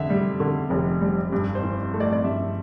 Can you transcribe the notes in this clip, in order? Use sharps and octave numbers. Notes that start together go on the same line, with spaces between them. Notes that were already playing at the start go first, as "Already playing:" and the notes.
Already playing: F2 D3 E5
G3
D3
F1
G3
G2
C5
E3
A3
D5
D5
G2 E5